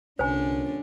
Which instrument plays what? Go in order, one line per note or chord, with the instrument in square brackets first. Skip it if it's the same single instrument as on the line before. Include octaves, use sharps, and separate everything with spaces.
[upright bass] C2 [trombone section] G2 A#2 C#4 [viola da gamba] D3 D4 [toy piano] C5 G#5